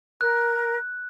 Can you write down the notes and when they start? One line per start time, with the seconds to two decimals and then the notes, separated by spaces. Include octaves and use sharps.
0.21 A#4 F#6